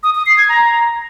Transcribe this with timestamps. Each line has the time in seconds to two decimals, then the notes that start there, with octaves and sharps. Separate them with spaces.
0.03 D#6
0.15 D#6
0.26 C7
0.38 G#6
0.49 A#5